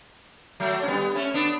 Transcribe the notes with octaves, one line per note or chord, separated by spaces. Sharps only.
F#3 A3
C#4
G3 B3
A3 C#4
B3 D4